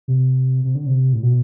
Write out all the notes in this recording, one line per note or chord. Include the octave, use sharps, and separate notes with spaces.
C3
C3
D3
C3
A2
B2